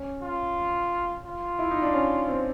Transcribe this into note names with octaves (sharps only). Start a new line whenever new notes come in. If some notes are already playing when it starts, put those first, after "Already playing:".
Already playing: C#4
F4
F4
E4
D#4
D4
C#4
C4